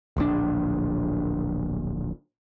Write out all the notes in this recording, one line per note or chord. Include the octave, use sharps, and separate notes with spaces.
D1 A#1 G#2 D4